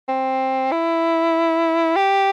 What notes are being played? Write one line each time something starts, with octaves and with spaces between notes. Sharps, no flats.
C4
E4
G4